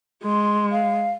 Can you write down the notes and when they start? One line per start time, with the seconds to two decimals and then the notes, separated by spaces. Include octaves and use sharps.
0.24 G#3 C6
0.71 F5